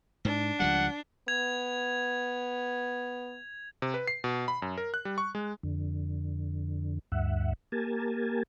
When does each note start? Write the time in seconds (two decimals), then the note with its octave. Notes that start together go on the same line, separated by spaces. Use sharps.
0.25 G#2 D4
0.60 C#2 F3 G3 F#5
1.28 B3 G#6 F7
3.82 C3
3.94 B4
4.08 C7
4.24 B2
4.48 B5
4.62 F#2
4.77 A#4
4.94 F#6
5.05 G3
5.18 C#6
5.35 G#3
5.63 F2 D3
7.12 D2 G2 E5 F#5
7.72 A#3 G4 A#4 G#5 A5